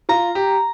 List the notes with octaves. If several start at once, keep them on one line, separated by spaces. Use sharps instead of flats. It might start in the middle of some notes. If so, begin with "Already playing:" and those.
F4 A#5
G4